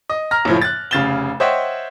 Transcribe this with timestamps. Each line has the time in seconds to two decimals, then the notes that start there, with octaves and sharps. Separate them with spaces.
0.10 D#5
0.31 A#5 F6 A#6
0.45 F#1 A2 F3
0.61 F#6 A6
0.91 F1 C#3 F5 A6 E7 G7
1.40 C5 C#5 D#5 E5 F#5 G5